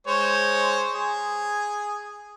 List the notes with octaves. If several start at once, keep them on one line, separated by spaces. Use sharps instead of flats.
G#3 C5 C#5
G#4